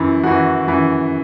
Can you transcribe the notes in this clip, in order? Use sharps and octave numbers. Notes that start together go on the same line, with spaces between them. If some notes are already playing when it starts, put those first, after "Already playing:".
Already playing: F#2 E3 E4
F#2 E3 F#4
F#2 E3